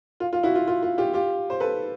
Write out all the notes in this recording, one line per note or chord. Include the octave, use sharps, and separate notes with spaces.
F4
F4
E4 F#4
F4
F4
F4
F4 G4
F4 G4
C5
A4 B4